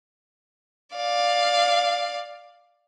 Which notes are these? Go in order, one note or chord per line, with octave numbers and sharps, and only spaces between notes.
D5 F5